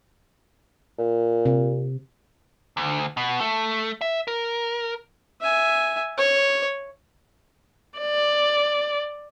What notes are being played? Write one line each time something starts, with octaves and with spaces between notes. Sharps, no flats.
A#2
C3
D2
B2
A3
E5
A#4
E5 G#5
C#5
D5